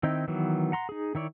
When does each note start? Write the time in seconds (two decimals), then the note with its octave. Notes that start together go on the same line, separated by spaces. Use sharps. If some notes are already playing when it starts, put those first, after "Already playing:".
0.03 D#3 C4 D#4 E4
0.28 D#3 E3 F#3 B3
0.72 F#5 A#5 C6
0.89 D#4 G#4
1.15 D#3 E4 C#5 D5